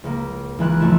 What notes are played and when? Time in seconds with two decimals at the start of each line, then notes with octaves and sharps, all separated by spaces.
0.04 C#2 A#3
0.59 C#2 D#3 E3 G#5 B5 F#6
0.80 F#1 F3 A3 E4 E7